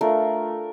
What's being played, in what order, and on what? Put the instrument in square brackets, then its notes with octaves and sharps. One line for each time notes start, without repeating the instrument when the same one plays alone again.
[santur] A3 D4 F4 A#4